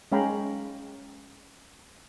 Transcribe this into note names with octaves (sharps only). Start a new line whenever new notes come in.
G#3 C#4 F5 G5 A#5 B5